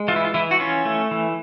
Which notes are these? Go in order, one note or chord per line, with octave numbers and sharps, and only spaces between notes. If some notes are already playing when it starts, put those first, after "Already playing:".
Already playing: G#3
E3 F4
E4
F4
E3 E4
F#4
C#4 F4
A3
E3